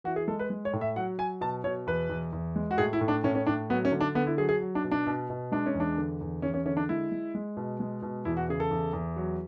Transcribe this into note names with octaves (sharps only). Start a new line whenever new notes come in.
E3 F#4
G#4
G#3 A4
B4
G#3
C#5
A2
E5
F#3 F#5
F#3 G#5
B2 A5
B2 C#5
E2 B4
E2
E2
G#3
F#4
A2 G#4
E4
A2
D4
A2 C#4
C#4
A2 D4
F#3 B3
C#4
D3
D4
D3 B3
E4
F#3 G#4
G#4
F#3
D4
B2
D4
B2
B2
G#3 D4
C#4
E2
D4
D3
E2
E2 C#4
C#4
D3 C#4
D4
G#3 E4
G#3
G#3
B2
G#3
B2
E2 E4
F#4
C#3 G#4
A4
E2
E2
F#3